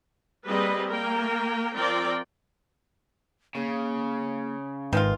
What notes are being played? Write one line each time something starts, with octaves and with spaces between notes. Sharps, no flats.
G3 A#3 C4 G#4 B4 D#5
A#3 A#4 G5
F3 C4 A#4 D5 G5
C#3 A#3
G#1 D#3 G#3 F4 B4